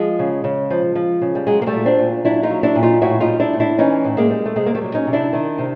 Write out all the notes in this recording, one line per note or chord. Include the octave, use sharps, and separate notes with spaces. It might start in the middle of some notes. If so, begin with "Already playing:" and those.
Already playing: F3 G#3
C#3
C#3
F3
F3
C#3
G3
F#3 G#3
A#3
G3 A3
A#2
C4 D4
A#2
F#3 D4 E4
D#4 F4
F#3
D4 E4
A#2
D#4 F4
A2 E4 F#4
D#4 F4
G3
D4 E4
A2
D4 E4
E3 C#4 D#4
A2
G#3 A#3
G3
A3
C3 G#3
A#3
G3 A3
F#3
C#4 D#4
C3
D4 E4
D#3
C3